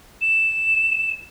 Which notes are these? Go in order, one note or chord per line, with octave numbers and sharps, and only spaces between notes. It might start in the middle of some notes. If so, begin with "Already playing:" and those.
E7